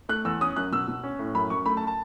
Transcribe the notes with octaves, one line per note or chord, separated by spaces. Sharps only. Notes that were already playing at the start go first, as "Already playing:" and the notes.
A3 F#6
E2 E6
C#4 D#6
F#2 F#6
B2 E6
B2
C#4
A2
F#2 B5
F#2 C#6
A3 B5
A5
A5